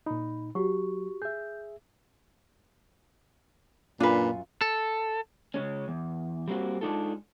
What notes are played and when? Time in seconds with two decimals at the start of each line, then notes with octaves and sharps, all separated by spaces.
0.06 A#2 D#4 B5
0.55 F#3 F#4 G4 C#6
1.22 G#4 E5 G6
4.00 F#2 A#2 D4 F4 B4 G#5
4.61 A4
5.54 C#3 E3 G#3 C#4
5.88 E2
6.48 G3 A#3 C4 F#4
6.81 G#3 D4 D#4 F4 A4